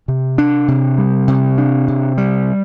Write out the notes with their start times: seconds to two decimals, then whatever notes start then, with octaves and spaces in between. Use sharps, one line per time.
0.08 C3
0.38 D4
0.68 C3
0.98 G3
1.28 C3
1.58 D4
1.88 C3
2.18 G3